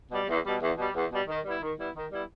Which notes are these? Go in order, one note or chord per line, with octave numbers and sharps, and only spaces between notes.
B2 G3
E2
B2 G3
E2
B2 G3
E2
B2 G3
D#3
G3 B3 E4
D#3
G3 B3 E4
D#3
G3 B3 E4